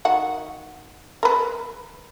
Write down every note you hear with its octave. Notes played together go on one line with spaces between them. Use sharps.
D#3 F#4 F#5
A#4 B4